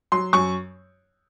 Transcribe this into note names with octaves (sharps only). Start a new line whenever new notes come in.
F#3 C6
F#2 C#6